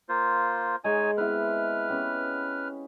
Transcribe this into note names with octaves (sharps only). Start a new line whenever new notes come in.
A#3 F4 C5
G#3 D#4 C#5 G#5
B3 C4 E4 B4 F6
B3 C#4 G4